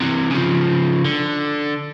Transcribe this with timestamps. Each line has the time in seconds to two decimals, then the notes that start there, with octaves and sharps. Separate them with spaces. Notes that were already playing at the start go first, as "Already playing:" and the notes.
0.01 C3 E3
0.30 C#3 F3
1.05 D3